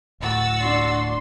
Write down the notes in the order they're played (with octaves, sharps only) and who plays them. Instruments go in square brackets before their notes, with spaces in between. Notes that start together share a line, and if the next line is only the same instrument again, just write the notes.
[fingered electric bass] D1 A2 [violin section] F#4 E6 A6
[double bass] D4 [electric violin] C6